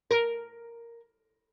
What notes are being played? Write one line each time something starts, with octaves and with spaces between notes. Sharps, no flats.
A#4